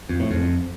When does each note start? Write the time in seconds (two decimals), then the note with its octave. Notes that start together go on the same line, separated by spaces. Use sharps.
0.09 F2
0.20 A2
0.31 F2